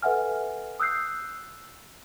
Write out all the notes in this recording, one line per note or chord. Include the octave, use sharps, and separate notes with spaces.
A4 B4 E5 F#5 G#5 F6
D#6 E6 F#6 G6 C7